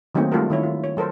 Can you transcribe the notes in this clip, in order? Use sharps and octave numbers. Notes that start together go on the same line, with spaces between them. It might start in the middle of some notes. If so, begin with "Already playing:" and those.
D#3 F#3 A3 A#3 C4 D#4
G3 A3 F4 F#4 A4 A#4
D#3 E4 C#5
F4
C#5
F#3 A4 A#4 C5